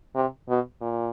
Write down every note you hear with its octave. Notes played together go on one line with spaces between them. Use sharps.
C3
B2
A#2